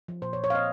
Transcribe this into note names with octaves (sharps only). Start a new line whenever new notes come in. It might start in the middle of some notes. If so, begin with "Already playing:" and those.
F3
A#2 C5
C#5
A#2
C#5
C4 D#5 F5